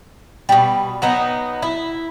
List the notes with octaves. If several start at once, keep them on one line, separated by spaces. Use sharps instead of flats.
B2 G3
F#3 B3 D#4
E4